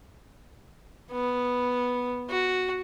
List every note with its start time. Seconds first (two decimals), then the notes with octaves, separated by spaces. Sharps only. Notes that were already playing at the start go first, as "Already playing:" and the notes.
1.12 B3
2.30 F#4